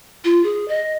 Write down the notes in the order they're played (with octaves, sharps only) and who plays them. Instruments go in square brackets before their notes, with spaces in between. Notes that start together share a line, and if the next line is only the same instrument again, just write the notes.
[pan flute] F4
G#4
D#5